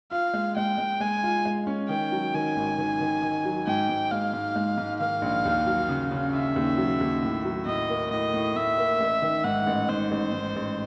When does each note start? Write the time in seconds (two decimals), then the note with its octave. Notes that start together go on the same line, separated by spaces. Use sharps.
0.11 F4 F5
0.34 G#3
0.56 G#3 G5
0.78 G#3
1.01 G#3 G#5
1.23 F4
1.45 G#3
1.67 C#4
1.89 D#3 G5
2.12 F#3
2.34 D#3 G#5
2.56 G#1
2.78 D#3
3.00 D#3
3.22 D#3
3.45 F#3
3.67 G#2 G5
3.89 G#2
4.11 G#3 F5
4.33 G#2
4.56 G#3
4.78 G#2
5.00 D#3 F5
5.22 A#1
5.45 D#2
5.67 F#3
5.89 C#3
6.11 C#3
6.33 C#3 E5
6.56 D#2
6.78 F#3
7.01 D#2
7.23 A2
7.45 F#3
7.66 A2 D#5
7.89 A#3
8.11 A2 D#5
8.34 A2
8.56 A2 E5
8.78 A#3
9.00 A1
9.22 D#3
9.44 G#2 F#5
9.67 A1
9.89 G#2 C5
10.11 A1
10.33 G#2
10.56 A1